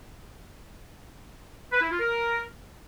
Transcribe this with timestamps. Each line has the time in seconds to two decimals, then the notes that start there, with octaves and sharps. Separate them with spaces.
1.72 B4
1.81 E4
1.91 F4
2.00 A#4